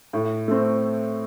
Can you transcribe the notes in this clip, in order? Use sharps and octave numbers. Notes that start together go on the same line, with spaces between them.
A2
A3 C4